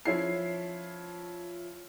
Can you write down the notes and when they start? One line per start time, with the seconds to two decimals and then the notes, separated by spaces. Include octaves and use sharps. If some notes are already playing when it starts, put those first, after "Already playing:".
0.06 F3 C#4 E4 C7